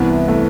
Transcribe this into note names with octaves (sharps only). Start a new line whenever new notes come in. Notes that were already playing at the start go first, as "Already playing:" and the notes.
Already playing: C2 C3 E3 B3
A3